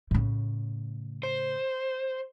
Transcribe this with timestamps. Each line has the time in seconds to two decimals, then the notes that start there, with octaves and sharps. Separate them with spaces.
0.11 A2 C#3
1.23 C5